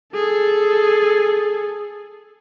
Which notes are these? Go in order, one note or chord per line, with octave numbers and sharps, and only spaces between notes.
G#4 A4